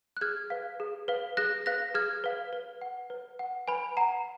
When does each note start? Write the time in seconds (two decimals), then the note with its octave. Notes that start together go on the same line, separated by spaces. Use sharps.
0.17 F#6
0.21 G#4 F6 G#6
0.50 B4 F5
0.80 G#4
1.08 B4 F5
1.37 G#4 F#6 A#6
1.66 B4 F5 F#6 A#6
1.94 G#4 F6 G#6
2.24 B4 F5
2.53 B4
2.81 F#5
3.10 B4
3.39 F#5
3.68 B4 G#5 B5
3.97 F#5 A#5